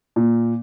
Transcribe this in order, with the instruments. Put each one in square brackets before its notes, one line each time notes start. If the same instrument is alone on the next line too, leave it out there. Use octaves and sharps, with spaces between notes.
[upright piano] A#2